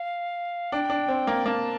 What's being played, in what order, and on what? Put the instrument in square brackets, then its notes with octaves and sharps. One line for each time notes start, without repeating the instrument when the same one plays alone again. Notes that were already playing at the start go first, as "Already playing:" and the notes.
Already playing: [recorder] F5
[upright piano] D4 [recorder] G5
[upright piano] D4
C4
A#3
[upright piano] A#3 [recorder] A5